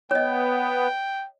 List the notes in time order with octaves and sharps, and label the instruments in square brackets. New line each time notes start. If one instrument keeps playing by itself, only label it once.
[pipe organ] B3 [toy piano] C#5 D#5 [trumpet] G5